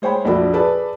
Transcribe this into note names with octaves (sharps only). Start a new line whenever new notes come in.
G#3 C5 C#5 G5 B5
A#1 F2 D4 F#4 A4 B5
G#4 A4 B4 D5 A5